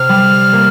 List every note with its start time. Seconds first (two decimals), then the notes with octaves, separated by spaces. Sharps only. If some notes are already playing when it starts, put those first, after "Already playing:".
Already playing: C3 F6
0.09 G3
0.53 A#3